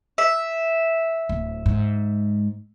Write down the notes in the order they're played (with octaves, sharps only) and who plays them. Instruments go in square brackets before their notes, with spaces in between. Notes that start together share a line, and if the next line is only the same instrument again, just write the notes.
[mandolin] E5
[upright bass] D1
G#2